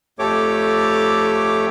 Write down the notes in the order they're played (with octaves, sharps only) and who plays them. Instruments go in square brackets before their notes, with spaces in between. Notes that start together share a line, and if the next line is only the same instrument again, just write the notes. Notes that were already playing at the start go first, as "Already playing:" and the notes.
[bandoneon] F2 A3 G4 A4 C#5 D6